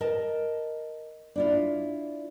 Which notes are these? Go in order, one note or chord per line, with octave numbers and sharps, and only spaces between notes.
A#4 D#5 A5
D4 E4 F4